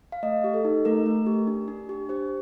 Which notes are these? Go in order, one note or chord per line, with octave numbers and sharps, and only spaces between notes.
F5
A3 D#5
G4
A4
D#4
A3 A#4
A3
G4
D4
D4
G4
G4 C5